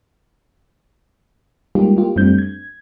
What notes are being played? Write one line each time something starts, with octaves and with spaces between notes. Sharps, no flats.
G3 G#3 A#3 D#4 F4 G4
A#3 F4 G4
F#2 G3 A3 C4 D4 G6
G#6